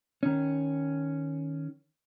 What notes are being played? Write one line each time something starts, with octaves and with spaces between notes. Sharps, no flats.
D#3 C#4